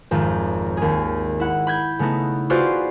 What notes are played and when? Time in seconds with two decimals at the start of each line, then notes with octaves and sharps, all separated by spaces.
0.11 G#1 F2
0.77 D#2 G#4
1.40 E4 F#5
1.67 B5 G6 G#6
1.99 C#3 A3 B3 D#4 E4
2.50 F4 F#4 G#4 B4 C5 D5